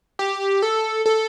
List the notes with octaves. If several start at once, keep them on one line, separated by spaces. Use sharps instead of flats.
G4
A4
A4